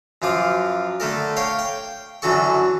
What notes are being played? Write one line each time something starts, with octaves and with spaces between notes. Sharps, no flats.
F#2 F3 F4 D6
D3 A3 A4 A#4
C#5 F5 G5
G5
F#2 D3 E3 F#4 A4 C#6